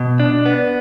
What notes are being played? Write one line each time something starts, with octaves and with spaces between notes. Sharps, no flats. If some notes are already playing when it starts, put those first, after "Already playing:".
Already playing: B2
D4
B3